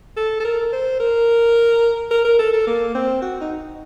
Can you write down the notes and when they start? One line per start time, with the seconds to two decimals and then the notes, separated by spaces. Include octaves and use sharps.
0.17 A4
0.40 A4
0.45 A#4
0.73 C5
1.00 A#4
2.11 A#4
2.25 A#4
2.39 A4
2.53 A4
2.67 A#3
2.95 C4
3.22 F#4
3.41 D#4